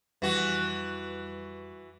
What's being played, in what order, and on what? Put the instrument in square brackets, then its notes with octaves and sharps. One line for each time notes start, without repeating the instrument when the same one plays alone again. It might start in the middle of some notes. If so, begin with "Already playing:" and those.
[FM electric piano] F2 G3 [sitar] E3 F#4